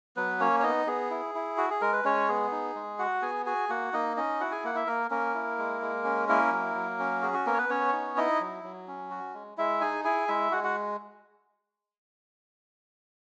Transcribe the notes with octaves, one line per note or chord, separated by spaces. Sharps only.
F#3 B3 B4
A#3 C#4 C#5
C#5
B3 D#4 D#5
B3 G#4
E4
E4
F#4
G#4
G#3 A#4
B4
G#3 C#4 C#5
B3 G#4
D#4
G#3
F#4 F#5
B3 G#4 G#5
F#4 G#4 G#5
A#3 F#4 F#5
A#3 D#4 D#5
C#4 D#4 D#5
E4 F#4 F#5
G#4 G#5
A#3 F#5
E4 E5
A#3 A#4
A#3 C#4 A#4
E4
G#3
G#3
C#4
A#3 E4 A#4
F#3
F#3
C#4
F#4 G#4
F#4
A#3 B3 A#4
C#5
B3 B4
B3 C#4 C#5
D#4
D#4 E4 D#5
F#3
F#3
C#4
F#4
G#3
G#3 E4 E5
D#4 G#4 G#5
E4 G#4 G#5
G#3 E4 E5
G#3 F#4 F#5
F#4 F#5